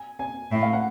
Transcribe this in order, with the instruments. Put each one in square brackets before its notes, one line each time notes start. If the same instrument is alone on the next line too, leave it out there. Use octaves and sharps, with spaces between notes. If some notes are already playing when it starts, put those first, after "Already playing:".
Already playing: [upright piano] G#5
G#5
[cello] A2 [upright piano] E5
[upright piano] F5
F#5